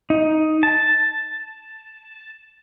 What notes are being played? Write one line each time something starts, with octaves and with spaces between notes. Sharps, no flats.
D#4
A5